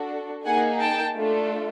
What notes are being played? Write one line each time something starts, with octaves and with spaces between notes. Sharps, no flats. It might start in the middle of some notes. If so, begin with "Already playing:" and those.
Already playing: D4 F#4 A4
A#3 D#4 G#4 F#5 G#5
G5 A5
A3 D4 F4 A4